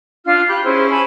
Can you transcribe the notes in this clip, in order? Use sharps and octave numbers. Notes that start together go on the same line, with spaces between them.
D4 F4 F6
G4 B5 F#6
C#4 E4 G#4 C5
G#5 A5 B5